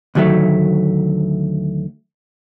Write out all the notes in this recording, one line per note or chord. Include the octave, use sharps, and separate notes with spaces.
D2 D#3 F#3 G3 A3